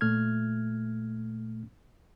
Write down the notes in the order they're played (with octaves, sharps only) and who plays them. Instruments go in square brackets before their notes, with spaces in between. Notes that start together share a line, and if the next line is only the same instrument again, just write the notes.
[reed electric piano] A#2 A3 F6 G#6